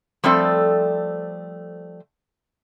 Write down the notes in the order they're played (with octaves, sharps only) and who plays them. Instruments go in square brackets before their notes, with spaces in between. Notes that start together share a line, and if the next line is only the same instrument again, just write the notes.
[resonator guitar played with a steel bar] F3 G3 A3 C4 A4 D5